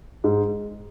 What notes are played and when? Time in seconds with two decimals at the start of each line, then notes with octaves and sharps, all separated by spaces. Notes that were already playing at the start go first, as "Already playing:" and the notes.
0.24 G#2